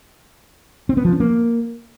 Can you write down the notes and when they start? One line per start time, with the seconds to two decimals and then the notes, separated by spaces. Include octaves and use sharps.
0.89 C4
0.97 B3
1.05 F3
1.12 C#4
1.20 A#3